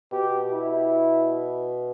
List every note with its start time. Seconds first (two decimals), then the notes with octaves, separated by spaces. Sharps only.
0.12 B2 G4
0.52 E4